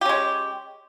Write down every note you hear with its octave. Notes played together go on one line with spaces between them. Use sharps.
G#3 C#4 G4